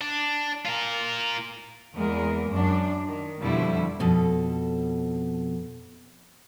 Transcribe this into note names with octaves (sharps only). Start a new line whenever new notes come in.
D4
F4 A#4
E2 G#3 A#3 A#4
F#2 D4
D#3
F2 B2 D3 F3 G3 E4
F2 B2 A4